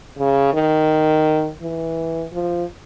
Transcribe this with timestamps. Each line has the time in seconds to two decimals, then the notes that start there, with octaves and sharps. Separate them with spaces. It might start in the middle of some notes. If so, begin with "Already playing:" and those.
0.18 C#3
0.54 D#3
1.61 E3
2.33 F3